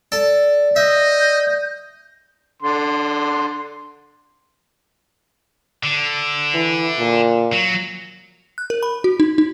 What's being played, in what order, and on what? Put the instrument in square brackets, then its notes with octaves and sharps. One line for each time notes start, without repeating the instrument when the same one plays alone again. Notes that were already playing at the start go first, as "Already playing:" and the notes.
[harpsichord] A4 A5 [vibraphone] D5
[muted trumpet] D#5 [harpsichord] E5 [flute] G6
[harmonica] D3 C6
[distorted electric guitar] D3
[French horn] E3
A#2
[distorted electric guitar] F#3
[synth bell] F#6
A#4
B5
F#4
D#4
D#4